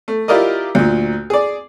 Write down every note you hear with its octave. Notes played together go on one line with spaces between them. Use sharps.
A3
E4 F4 G4 A#4 D5 D#5
D2 A#2
G#4 D5